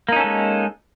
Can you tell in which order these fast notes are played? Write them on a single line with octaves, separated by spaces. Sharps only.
A#3 D#4 C#4 A4 G#3